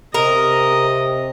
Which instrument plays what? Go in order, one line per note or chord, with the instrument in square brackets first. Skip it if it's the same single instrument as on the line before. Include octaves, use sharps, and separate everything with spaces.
[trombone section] C3 [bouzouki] A#4 [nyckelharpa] D#5